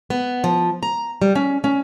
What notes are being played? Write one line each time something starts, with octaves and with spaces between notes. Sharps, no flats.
B3
F3
A#5
G3
C#4
C#4